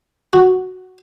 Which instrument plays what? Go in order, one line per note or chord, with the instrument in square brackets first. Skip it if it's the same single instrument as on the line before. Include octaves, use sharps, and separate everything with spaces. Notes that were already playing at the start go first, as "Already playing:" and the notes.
[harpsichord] F#4